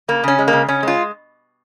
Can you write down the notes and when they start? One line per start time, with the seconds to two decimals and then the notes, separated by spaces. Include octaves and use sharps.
0.08 C#3 A#3
0.24 C#3 C#4
0.39 G#3
0.48 A#3
0.53 C#3
0.68 C#3 C#4
0.83 G#3 F4